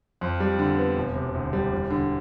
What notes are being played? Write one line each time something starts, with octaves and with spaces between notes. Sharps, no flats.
F2
G3
D3
B3
E1
C3
D2
G3
E1
D3